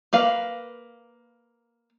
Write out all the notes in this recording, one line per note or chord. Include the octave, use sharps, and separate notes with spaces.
A#3 B4 F5